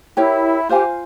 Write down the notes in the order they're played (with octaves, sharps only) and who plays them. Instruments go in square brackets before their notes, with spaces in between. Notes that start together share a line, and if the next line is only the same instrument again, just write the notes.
[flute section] E4 [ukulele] G4 A#4 C#5
[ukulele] F4 C5 F5 G#5 [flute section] G4